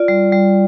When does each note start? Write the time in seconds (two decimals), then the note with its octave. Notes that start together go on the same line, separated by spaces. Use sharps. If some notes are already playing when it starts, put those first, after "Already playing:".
Already playing: F4 D5
0.08 G3
0.32 G3